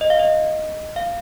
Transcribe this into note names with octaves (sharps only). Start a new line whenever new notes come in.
D#5
F5
D#5
F5